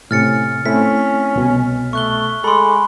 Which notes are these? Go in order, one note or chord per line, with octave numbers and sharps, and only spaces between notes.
A2 C3 C#4 F6 A6 C#7
A3 C4 C#4 E4 B6
C2 B2
A3 C#6 F#6 G7
G#3 A4 B5 C6 D6